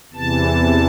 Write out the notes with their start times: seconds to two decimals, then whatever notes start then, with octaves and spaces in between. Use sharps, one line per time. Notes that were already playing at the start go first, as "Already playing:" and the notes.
0.13 E2 C3 E3 A5